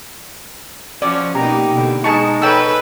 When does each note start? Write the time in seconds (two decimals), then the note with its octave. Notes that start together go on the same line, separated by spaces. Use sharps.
1.02 F3 C#4 F#4 D5
1.35 B2 A#3 D#4 G4 A#5
1.73 B2 D3
2.04 G#3 D#4 G#4 A5 C#6
2.42 A4 B4 C#5 G5 E6